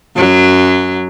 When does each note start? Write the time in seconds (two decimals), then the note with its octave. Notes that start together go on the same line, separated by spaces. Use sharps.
0.16 F#2 F#3